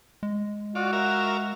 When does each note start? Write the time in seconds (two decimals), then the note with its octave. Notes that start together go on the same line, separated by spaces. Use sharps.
0.23 G#3
0.75 F4 F#4 D5
0.93 A#4 E5 F5